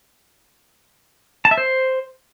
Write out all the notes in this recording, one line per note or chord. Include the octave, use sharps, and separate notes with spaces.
A5
E5
C5